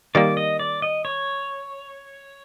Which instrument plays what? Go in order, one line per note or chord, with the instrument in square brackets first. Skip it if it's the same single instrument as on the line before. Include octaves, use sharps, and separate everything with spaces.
[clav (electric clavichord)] D#3 G3 A#3 [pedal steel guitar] D5
[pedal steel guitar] D#5
D5
D#5
C#5